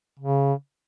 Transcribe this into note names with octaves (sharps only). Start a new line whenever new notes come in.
C#3